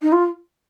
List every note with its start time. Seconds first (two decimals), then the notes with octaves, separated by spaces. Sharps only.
0.01 D#4
0.12 F4